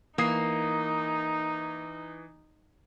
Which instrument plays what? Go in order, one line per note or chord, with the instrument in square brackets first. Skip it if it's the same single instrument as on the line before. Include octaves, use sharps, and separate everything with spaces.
[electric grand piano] E3 D#6 C7 [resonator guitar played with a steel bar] A#3 [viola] D#4